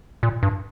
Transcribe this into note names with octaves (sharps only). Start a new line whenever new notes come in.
A#2
G2